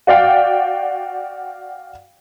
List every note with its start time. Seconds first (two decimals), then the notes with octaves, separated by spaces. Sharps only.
0.07 F#4 D5 F5 G5